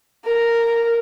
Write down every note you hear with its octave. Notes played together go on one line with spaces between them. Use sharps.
A#4